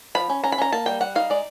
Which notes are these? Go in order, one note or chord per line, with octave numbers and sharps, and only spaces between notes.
F3 B5
C#4
C#4 A#5
B5
C#4 A#5
A#3 A5
G3 G5
G3 F#5
D#4 F5
G#3 D5